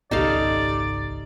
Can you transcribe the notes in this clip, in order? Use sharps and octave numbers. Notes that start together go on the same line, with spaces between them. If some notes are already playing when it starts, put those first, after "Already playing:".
G#1 C#2 D#4 G4 A4 D5 D#5 F5